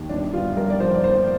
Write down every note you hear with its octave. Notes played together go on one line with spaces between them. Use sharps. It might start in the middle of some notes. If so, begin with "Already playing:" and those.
Already playing: D#2 D#3
G1 D4
G1 F4
G2 A#4
D5
F3 C5
D5
G1 C5